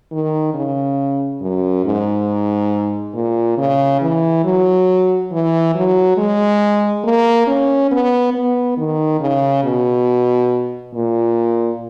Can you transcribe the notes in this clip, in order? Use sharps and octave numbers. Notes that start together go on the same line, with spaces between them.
D#3
C#3
F#2
G#2
A#2
C#3
E3
F#3
E3
F#3
G#3
A#3
C#4
B3
B3
D#3
C#3
B2
A#2